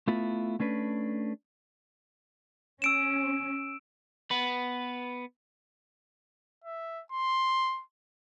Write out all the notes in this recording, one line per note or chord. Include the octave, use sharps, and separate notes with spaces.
A3 B3 E4 F4 B4
A3 C#4 D4 B4
C#4 E6 D7 E7
B3 B4
E5
C6